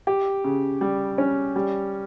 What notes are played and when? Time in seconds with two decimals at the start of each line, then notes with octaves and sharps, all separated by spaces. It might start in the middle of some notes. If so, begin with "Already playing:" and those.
0.07 G4
0.44 C#3
0.81 G3
1.18 C#4
1.56 G3